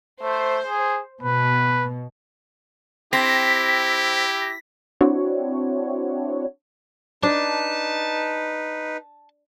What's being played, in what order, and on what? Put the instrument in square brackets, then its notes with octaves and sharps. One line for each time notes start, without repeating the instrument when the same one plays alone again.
[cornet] A3 [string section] C5
[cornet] G#4
[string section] B2 [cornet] B4
[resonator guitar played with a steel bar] C4 [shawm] E4 [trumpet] G4 [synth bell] A#6 B6
[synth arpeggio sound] C4 D4 E4 F#4 C#5
[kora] D4 [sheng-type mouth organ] D#4 B4 [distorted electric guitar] A5